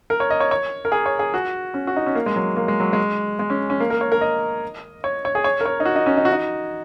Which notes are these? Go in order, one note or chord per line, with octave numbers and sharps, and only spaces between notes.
A#4
C#5
D#5
C#5
C#5
A#4
G#4
C#5
G#4
F#4
C#4
F#4
D#4
C#4
A#3
G#3
F#3
A#3
G#3
F#3
G#3
G#3
C#4
C#4
A#3
A#4
C#5
A#4
D#5
C#5
C#5
G#4
C#5
A#4
C#5
D#4
F#4
D#4
C#4
D#4
F#4
D#4